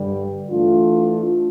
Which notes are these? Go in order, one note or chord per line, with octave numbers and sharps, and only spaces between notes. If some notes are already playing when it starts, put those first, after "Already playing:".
Already playing: G2 D3 G3
E3 A3 D4 F4